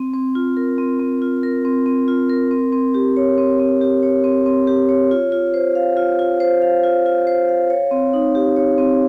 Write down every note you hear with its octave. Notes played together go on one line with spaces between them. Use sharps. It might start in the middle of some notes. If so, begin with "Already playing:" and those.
Already playing: C4
C4
F4
A#4
C4
C4
F4
A#4
C4
C4
F4
A#4
C4
C4
G4
C#5
C4
C4
G4
C#5
C4
C4
G4
C#5
F4
F4
C5
F5
F4
F4
C5
F5
F4
F4
C5
F5
C#5
C4
D#4
G4
C#5
C4